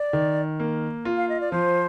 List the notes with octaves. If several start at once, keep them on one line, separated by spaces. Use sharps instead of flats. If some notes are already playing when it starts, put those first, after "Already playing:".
Already playing: D5
D#3
A#3
F4
F5
D#5
D5
F3 C5